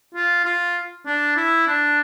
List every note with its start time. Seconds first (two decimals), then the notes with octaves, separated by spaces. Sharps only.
0.14 F4
0.45 F4
1.06 D4
1.36 E4
1.66 D4